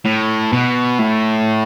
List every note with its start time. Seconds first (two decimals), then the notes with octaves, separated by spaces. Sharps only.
0.05 A2
0.53 B2
0.99 A2